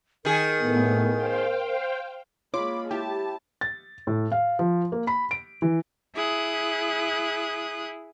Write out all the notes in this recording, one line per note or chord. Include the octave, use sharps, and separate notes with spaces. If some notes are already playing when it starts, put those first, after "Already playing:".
D#3 G#4 A#4
A2 A3 B3
C5 F5 G5
G#3 A#3 F4 C#5 B5 D6
E4 G4 A5
A6
A2
F5
F3
A#3
B5
D7
E3
E4 G#4 D#6 F#6